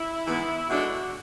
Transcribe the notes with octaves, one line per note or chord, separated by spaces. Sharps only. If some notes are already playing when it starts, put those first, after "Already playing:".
Already playing: E4
G#2 E3 B3
B2 G#3 D4 F#4 A4